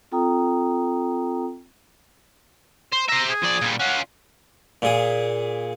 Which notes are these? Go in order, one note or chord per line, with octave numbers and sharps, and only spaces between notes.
C4 F4 A4 G5 A#5 D#6
C5
C5 E5 A#5
G#4
F3 D5
A#2 G3
C#4 F4 F#5
A#2 G#4